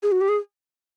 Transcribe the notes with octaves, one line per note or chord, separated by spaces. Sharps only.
G#4
F#4
G4
G#4